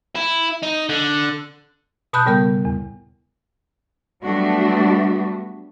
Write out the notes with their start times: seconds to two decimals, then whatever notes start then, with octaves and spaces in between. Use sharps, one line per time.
0.15 E4
0.63 D#4
0.89 D3
2.13 B2 A5 B5 D#6 F#6 G6
2.26 A2 C#3 G3 B3 A#4 G6
2.65 E2
4.23 F#3 G3 A3 B3 D4 F#4